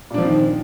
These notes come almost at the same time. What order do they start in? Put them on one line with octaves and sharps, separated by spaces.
A#2 D4 F3 C4 D#3